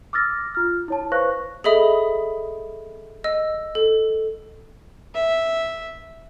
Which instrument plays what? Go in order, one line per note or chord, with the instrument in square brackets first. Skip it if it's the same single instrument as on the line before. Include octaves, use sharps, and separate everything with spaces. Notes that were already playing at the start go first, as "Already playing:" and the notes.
[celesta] D6 E6 F6 A6 A#6
F4 F6
E4 C#5 A5
B4 C5 F5 C#6 F#6 A#6
[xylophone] G#4 A4 D#5 E5 B5 D#6
D#5 E6
A4
[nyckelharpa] E5